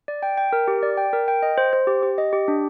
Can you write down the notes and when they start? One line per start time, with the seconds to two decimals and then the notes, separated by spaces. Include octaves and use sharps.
0.08 D5
0.23 G5
0.37 G5
0.53 A#4
0.68 G4
0.83 D5
0.97 G5
1.13 A#4
1.28 G5
1.42 D#5
1.58 C5
1.73 C5
1.87 G4
2.03 G4
2.18 D#5
2.33 G4
2.48 D4